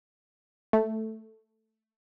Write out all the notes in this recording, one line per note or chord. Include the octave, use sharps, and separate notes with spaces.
A3